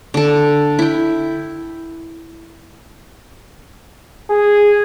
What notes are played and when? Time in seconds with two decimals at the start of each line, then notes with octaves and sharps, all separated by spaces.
0.14 D3 A4
0.79 E4 G5
4.30 G#4